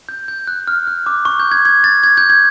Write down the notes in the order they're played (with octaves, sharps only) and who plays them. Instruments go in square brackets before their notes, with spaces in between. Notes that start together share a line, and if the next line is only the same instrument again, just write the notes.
[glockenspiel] G6
G6
F#6
F6
F#6
D6
C#6
G6
G#6
G#6
A6
G#6
G6
G#6